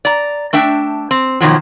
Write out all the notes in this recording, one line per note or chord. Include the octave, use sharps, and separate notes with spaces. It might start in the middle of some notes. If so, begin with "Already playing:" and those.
D5 A#5
A3 D4 E5 G5
C4
B2 D#3 F3 F#3